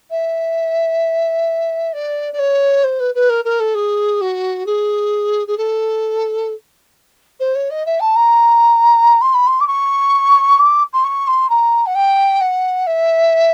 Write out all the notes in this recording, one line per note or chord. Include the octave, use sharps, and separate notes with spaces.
E5
D5
D5
C#5
C5
B4
B4
A#4
A#4
A4
G#4
F#4
G#4
G#4
A4
C5
C#5
D#5
E5
A5
A#5
C6
B5
C6
D6
C#6
D6
C6
C#6
C6
A#5
F#5
G5
F#5
E5